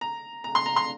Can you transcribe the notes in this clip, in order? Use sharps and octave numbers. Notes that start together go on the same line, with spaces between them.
A#5
A#5
C6
A#5
C6